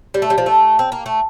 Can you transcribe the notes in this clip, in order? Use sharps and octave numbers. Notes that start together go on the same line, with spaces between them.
G3
A3
G3
F3
A3
C4
A#3
A3